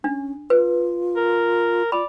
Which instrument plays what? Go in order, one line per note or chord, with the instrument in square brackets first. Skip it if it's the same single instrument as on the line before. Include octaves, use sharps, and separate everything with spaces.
[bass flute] C#4 [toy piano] D4
[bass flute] F4 [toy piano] B4
[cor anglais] A#4
[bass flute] F4 [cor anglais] D5 [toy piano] B5